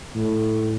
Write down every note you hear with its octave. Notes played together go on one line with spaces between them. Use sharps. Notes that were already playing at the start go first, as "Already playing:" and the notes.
A2